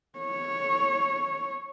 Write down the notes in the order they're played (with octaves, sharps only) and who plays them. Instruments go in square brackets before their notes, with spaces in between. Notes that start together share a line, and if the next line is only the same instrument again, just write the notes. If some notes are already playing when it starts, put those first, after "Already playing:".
[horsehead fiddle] C#5